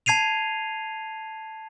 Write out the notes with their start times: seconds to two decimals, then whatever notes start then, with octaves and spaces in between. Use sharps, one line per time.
0.06 A5 G#6 C7 D#7 F7